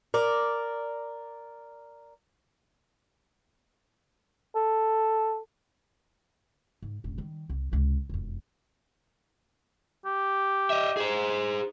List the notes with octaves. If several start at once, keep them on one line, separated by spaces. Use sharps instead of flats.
A#4 D5
A4
G#2
E1 A1
D#3 G3
C2
C#2 C3
E1 F2
G4
D#5 E5
G#4 C5